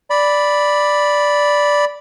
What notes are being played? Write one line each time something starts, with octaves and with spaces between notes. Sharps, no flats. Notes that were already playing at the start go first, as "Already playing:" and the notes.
D5 B5